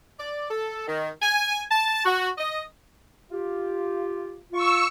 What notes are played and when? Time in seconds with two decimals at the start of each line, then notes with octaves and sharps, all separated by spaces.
0.19 D5
0.50 A4
0.87 D#3
1.22 G#5
1.71 A5
2.05 F#4
2.38 D#5
3.31 F4 G4
4.52 F4 C#6 E6